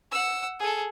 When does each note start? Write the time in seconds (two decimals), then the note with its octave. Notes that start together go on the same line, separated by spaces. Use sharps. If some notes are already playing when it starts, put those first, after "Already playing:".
0.12 F#5 E6
0.60 G#4 A4